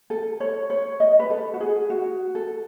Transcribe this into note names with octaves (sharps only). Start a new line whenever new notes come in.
A4
C#5
C#5
D#5
B4
A4
F#4
G#4
F#4
A4